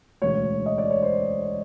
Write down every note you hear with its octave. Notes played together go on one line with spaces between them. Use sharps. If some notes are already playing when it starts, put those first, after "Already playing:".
E1 D2 C#3 C#5
D#5
D5
C#5
C5